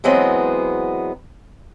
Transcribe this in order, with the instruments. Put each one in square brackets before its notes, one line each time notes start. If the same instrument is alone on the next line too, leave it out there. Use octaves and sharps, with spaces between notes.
[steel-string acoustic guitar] E3 F#3 G#3 B3 C4